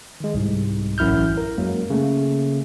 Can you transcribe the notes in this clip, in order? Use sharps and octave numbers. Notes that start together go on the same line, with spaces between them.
D#3 G#3
C2 G#2
A1 F#2 E4 F6 G6
A#4
F#2 F#3 G#3 A#3
C#3 A3 A#3